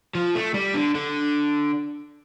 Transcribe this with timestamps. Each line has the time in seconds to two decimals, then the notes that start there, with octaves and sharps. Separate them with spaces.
0.15 F3
0.35 A3
0.54 G3
0.75 D3
0.95 D3